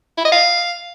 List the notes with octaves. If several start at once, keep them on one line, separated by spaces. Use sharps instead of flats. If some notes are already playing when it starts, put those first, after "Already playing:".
E4
D#5
F5